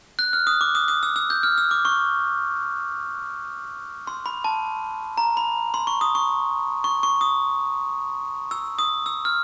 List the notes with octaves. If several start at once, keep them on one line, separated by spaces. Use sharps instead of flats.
F#6
F6
D#6
D6
D#6
D#6
E6
E6
G6
F6
E6
D6
C#6
C6
B5
A5
A#5
B5
C6
C#6
D#6
C#6
C#6
C#6
D#6
E6
D#6
E6
F6